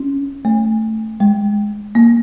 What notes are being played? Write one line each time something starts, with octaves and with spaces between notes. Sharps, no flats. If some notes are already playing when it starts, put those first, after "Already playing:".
Already playing: C#4
A3
G#3
A#3